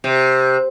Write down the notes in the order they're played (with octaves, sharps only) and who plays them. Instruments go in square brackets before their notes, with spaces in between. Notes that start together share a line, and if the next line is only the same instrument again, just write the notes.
[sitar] C3